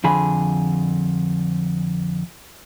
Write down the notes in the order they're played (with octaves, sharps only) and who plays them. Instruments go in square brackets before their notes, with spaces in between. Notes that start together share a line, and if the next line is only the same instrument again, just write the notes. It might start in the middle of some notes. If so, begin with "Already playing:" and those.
[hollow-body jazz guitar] F2 D3 G#4 B5